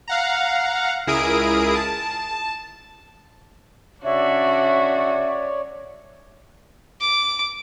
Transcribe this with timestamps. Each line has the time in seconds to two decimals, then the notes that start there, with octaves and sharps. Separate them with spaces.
0.08 F5 F#5 A#5
1.07 C#2 E4 G#4 A#4 D#6 D7
1.75 A5
4.04 C#3 D4 F#4 C#5 D5 E5
7.01 D6